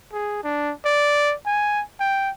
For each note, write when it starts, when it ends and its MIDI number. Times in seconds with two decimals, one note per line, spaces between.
0.12 0.41 68
0.43 0.72 62
0.85 1.34 74
1.46 1.82 80
2.00 2.30 79